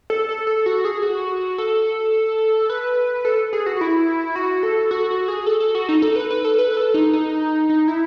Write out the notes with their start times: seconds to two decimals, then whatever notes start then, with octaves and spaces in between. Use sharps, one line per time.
0.10 A4
0.29 A4
0.47 A4
0.66 F#4
0.85 G#4
1.03 F#4
1.58 A4
2.70 B4
3.25 A4
3.53 G#4
3.66 F#4
3.76 F#4
3.81 E4
4.36 F#4
4.63 A4
4.91 F#4
5.10 F#4
5.28 G#4
5.46 A4
5.60 A4
5.75 F#4
5.89 D#4
6.02 A4
6.16 B4
6.30 B4
6.45 A4
6.58 B4
6.70 B4
6.77 A4
6.94 D#4
7.13 D#4
7.69 D#4
7.88 E4